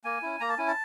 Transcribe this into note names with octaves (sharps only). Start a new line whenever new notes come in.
A#3 G#5
C#4 E4
A#3 A#5
A5
C#4 E4 G#5
A5